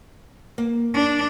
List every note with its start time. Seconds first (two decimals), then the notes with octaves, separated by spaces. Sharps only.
0.58 A#3
0.94 D4